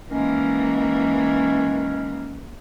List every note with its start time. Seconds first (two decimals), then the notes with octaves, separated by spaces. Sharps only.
0.10 D#3 E3 G#3 A#3 C#4